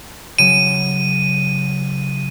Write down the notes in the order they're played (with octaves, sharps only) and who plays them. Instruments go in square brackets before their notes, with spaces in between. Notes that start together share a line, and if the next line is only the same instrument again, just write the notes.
[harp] C#3 F#3 [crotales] D#7